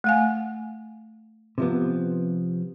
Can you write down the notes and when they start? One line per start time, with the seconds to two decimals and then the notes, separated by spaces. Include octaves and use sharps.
0.04 A3 F5 G#5
1.58 C3 F3 B3